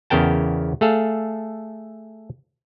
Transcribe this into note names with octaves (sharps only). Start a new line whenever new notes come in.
E2 C#3 B3 A#4 G5 A5
A3 G#4 A4 F5